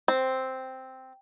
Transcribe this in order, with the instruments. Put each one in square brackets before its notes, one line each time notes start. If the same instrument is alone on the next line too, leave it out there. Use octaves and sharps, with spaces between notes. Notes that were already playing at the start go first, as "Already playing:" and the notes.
[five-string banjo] C4